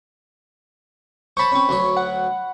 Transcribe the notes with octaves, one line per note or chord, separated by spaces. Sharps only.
C5 C#5 A5 B5 C#6
C4 C#4
D2 F#3 C#5
F#5